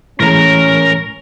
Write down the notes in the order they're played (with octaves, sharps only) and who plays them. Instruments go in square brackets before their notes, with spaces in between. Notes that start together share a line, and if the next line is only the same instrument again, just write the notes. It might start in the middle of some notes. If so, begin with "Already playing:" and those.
[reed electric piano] A2 E3 G#3 [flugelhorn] C#4 [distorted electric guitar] A#4 A#5